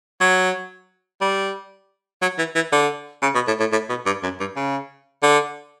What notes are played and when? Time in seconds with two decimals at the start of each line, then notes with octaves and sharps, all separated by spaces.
0.21 F#3
1.21 G3
2.22 F#3
2.39 E3
2.55 E3
2.72 D3
3.22 C#3
3.35 B2
3.48 A2
3.60 A2
3.72 A2
3.89 B2
4.06 G2
4.23 F#2
4.40 G2
4.56 C#3
5.23 D3